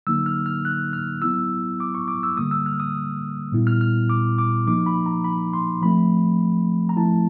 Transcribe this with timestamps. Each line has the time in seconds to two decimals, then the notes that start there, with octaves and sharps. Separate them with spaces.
0.07 D3 F#3 A#3 D#4 E6
0.26 F6
0.46 F6
0.65 F#6
0.93 F6
1.22 F#3 B3 E4 E6
1.80 D6
1.95 C#6
2.08 D6
2.23 E6
2.37 D3 G3 A#3 D#6
2.51 E6
2.66 F6
2.80 D#6
3.52 A#2 G3 B3 E4
3.67 F6
3.81 F6
4.09 D6
4.38 D6
4.67 F3 A#3 D#4 D6
4.86 B5
5.06 A#5
5.24 B5
5.53 C6
5.82 F3 A3 C4 B5
6.89 A#5
6.97 F3 A3 C4 E4 A5